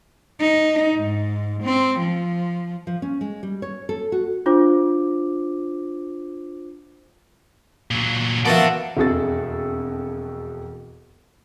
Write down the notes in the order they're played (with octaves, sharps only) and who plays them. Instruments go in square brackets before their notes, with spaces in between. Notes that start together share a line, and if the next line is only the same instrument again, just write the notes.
[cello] D#4
G#2
C4
F3
[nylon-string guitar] F3
C#4
G#3
G3
C#5
A4
F#4
[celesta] D4 F4 C5 D6
[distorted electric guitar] A#2 F#3
[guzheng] F3 B3 [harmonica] F#4 A5 [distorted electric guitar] A4 D5 [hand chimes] A#4 E5
[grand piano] E1 F2 F#4 G#4 A4 A6